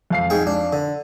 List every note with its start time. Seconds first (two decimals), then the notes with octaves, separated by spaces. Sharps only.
0.10 F2 F5 C7
0.30 G#2 G#4 G5
0.47 D4
0.73 D3